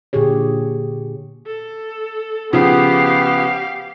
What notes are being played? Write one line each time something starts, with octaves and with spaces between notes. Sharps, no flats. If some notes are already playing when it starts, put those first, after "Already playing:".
A#2 D3 G4 G#4 C#5
A4
C#3 F3 B3 G4 F5